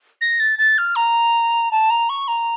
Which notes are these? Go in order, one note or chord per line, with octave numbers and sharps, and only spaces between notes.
A#6
A6
A6
F6
A#5
A5
A#5
C#6
A#5